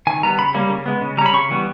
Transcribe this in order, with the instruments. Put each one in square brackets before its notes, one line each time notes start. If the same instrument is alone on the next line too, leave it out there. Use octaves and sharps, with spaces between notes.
[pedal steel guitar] D#3 G#5
G3 B3 A#5
C#3 B5
G3 A#3 C#4
C#3
G#3 B3
C#3
G3 A#5
C#4 B5
C#3 C#6
E3 G3 B3